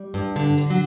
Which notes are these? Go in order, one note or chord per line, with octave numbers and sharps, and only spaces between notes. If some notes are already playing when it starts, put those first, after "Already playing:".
Already playing: G3
G2
D3
D3
F#3